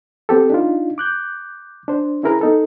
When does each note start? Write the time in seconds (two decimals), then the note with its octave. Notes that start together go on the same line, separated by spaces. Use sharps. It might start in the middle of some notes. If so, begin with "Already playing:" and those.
0.29 B3 C4 G4 A4
0.50 D4 D#4 F4
0.98 D6 F#6 G6
1.88 D4 C5
2.23 C#4 E4 G#4 A#4 B4 A#5
2.41 B3 D#4 A4